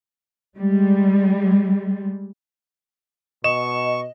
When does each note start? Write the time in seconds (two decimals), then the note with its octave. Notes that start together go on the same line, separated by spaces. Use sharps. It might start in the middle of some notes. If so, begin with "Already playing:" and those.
0.58 G3 G#3
3.44 B2 D#5 C#6 E7